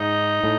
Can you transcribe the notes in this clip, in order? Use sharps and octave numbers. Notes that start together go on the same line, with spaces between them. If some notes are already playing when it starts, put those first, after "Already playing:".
Already playing: G#2 D#4
A2